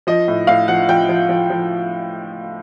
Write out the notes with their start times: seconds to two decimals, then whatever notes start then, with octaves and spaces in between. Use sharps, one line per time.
0.07 F3 D#5
0.28 A2
0.47 A2 F5
0.68 F3 F#5
0.89 F3 G5
1.09 F3
1.29 F3
1.50 F3